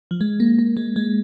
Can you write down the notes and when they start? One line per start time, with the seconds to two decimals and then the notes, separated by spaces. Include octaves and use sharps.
0.11 F3
0.21 G#3
0.40 A#3
0.59 A#3
0.77 G#3
0.96 G#3